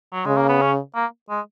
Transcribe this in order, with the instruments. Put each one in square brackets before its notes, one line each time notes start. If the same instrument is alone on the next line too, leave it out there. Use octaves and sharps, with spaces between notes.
[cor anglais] F#3
[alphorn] C#3 [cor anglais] G#3
[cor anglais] A#3
B3
C#4
A#3
G#3